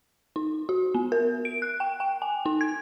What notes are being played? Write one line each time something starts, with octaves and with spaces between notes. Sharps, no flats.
D#4
F#4
B3
A#4
D7
F#6
G5
G5
G#5
D#4
G#6